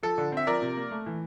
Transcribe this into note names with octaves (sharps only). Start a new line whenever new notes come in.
F3 A4
D3
C4 E5
F3 A#4 D5
C3
A#3
A3
E3